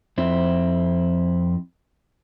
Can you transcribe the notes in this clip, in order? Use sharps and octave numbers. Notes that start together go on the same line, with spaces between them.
F2 C4 E4